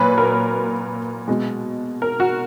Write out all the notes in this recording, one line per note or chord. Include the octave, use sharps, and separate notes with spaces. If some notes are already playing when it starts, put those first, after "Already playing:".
Already playing: A#2 F#3 B4
A#4
B2 G#3
A#4
F#4